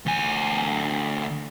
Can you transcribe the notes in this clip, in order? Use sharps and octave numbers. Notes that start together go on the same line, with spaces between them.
D2 G#5